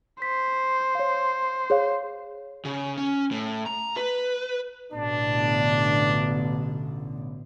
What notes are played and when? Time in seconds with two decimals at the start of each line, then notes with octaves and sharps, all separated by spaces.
0.22 C5 B6
0.95 C#5 F5
1.70 G#4 C#5 F5
2.65 C#3
2.97 C#4
3.31 A2
3.66 A#5
3.97 B4
4.92 A1 B2 D3 D4